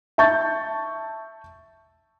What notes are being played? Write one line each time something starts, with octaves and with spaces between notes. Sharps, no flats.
E5 A5 C#6 G6 A6